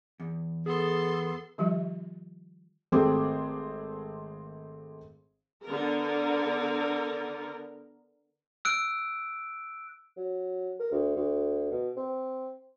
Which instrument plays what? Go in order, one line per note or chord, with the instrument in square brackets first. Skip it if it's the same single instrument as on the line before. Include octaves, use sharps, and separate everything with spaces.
[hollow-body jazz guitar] E2
[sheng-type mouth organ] B3 [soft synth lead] G#4 [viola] A4 C6
[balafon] D#3 F3 G3 F4 G4 E5
[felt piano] G#1 A3 C4 G4 G#4 D6
[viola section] D3 B3 A#4
[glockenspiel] E6 F#6 D7
[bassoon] F#3
A#4
D2
D2
B2
C4